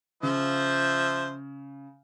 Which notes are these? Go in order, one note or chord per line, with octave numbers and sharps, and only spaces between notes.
C#3 F3 C5 E5